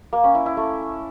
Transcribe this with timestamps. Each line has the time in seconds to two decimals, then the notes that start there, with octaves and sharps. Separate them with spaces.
0.13 A#3
0.24 C#4
0.35 E4
0.46 E4
0.57 A3